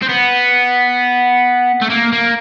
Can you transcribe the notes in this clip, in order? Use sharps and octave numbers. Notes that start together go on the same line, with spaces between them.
C4
B3
A3
A#3
A#3